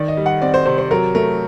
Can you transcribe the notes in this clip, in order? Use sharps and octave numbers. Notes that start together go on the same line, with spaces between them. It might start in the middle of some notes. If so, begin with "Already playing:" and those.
Already playing: D#3 D5
D#5
G3
F#5
C4 D5
C5
C3 C5
C5
F#3 A#4
A3 A#4